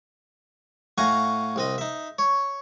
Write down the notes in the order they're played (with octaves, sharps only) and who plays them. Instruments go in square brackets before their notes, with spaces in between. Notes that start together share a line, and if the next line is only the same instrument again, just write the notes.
[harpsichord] A2 F#4 F5 G#5 A#5
C2 C4 D#5
D#4 E5
C#5